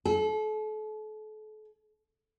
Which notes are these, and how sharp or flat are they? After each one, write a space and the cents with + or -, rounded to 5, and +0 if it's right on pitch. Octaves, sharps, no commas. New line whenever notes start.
A4 -35